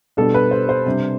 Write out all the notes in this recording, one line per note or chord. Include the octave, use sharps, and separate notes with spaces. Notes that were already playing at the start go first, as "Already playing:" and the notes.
B2 G3 D4 A4
B4
C5
C5
C3 G3 D4